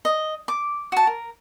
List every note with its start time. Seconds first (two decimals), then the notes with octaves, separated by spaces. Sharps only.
0.05 D#5
0.48 D6
0.92 F#4 A5
1.07 A#4